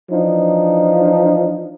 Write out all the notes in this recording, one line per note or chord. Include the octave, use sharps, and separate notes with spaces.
E3 F3 D4 D#4